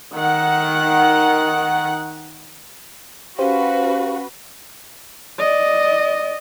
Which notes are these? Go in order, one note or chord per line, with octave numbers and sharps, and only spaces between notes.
D#3 F#5
C#4 F#4 G4 B4 C5 F5
D5 D#5